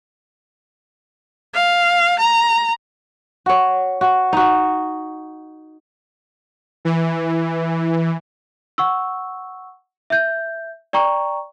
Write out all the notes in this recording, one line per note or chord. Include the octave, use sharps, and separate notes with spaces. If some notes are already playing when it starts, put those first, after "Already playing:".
F5
A#5
F#4 C#5
F#4
D#4 F#4
E3
F#5 C#6 E6
E5 G6
D5 G5 A#5 C#6